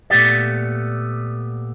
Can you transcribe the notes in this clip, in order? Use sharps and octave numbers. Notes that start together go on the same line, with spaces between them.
A#2 A3 B3 G4 D5